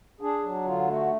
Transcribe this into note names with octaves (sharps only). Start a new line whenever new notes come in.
D4 G#4
F#3
D3 F4
A3 F#4